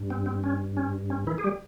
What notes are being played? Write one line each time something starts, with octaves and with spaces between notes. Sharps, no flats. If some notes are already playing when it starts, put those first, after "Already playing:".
Already playing: G2
C4
C4
C#4
C#4
C#4
E3 E4
G#4
G3 G4